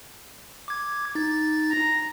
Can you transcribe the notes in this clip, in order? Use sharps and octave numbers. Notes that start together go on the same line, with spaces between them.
D6 G#6
D#4 A6
A#5